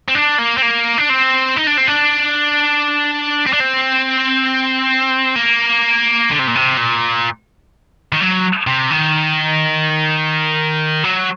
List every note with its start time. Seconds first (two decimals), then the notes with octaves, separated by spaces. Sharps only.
0.08 C4
0.15 D4
0.38 A#3
0.57 C4
0.62 A#3
0.98 D4
1.09 C4
1.56 D#4
1.67 D4
1.78 C4
1.88 D4
3.46 C4
3.53 D4
3.60 C4
5.35 A#3
6.31 D3
6.39 C3
6.47 A#2
6.55 C3
6.77 A#2
8.12 D#3
8.20 F#3
8.67 C3
8.91 D#3
11.04 F#3